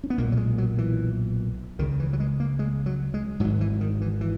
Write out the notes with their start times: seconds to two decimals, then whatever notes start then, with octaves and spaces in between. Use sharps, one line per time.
0.04 C#4
0.10 B3
0.18 B1 A#2 A#3
0.32 F#3
0.37 G#3
0.58 F#3
0.78 E3
1.79 C#2 D#3
1.82 C#3
2.00 E3
2.13 F#3
2.20 G#3
2.40 A#3
2.59 G#3
2.86 F#3
3.14 G#3
3.40 G#2 F#3
3.44 G#1
3.61 E3
3.81 D#3
4.01 E3
4.21 E3